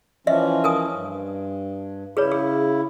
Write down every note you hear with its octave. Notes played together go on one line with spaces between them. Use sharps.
E3 F3 C#4 D#5 E5
A#4 G#5 D#6
G2
C#3 E4 G#4 B4 C#5
G#4